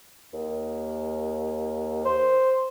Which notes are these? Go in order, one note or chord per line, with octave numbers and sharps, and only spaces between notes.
D#2
C5